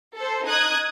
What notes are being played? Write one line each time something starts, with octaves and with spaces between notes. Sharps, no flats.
A4 C5
D#4 D#6 F#6 G#6